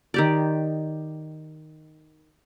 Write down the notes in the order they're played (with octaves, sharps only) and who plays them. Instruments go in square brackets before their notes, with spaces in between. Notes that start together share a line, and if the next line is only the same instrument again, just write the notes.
[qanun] D#3 G4 D5